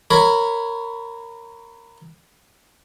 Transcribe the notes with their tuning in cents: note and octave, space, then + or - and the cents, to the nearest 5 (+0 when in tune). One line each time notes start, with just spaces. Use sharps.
A#4 -15 C#5 +0 B5 +5